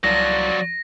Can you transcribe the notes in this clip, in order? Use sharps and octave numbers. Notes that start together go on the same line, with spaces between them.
C2 F3 F#3 D5 A#6